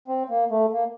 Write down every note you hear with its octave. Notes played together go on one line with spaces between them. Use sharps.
C4
A#3
A3
A#3